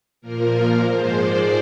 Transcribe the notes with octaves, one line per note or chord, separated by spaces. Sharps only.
A#2 F3 A#3 A#4
G#2 F3 G#3 C5
D5